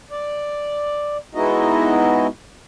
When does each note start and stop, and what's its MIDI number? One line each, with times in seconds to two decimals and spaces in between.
0.11 1.17 74
1.35 2.27 56
1.35 2.27 59
1.35 2.27 63
1.35 2.27 64
1.35 2.27 66
1.35 2.27 75